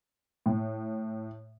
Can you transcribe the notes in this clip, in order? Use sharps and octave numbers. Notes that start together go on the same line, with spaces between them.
A2